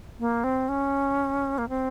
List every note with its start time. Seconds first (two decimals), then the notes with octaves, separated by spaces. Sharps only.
0.19 A#3
0.44 C4
0.69 C#4
1.58 A#3
1.69 C4